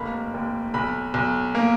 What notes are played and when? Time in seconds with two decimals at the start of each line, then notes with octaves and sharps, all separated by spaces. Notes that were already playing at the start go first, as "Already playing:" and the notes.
Already playing: F1 A#3 B5
0.34 D#2
0.74 B1 B5
1.14 B1
1.55 A#3